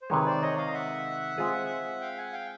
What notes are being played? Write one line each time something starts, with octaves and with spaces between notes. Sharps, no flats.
C5
C3 D#3 G#3 B4 C#5
C5 D5
C#5 D#5
D#5 F5
E5 F#5
G#3 C4 F4 G#4
F5 G5
F#5 G#5
F5 G5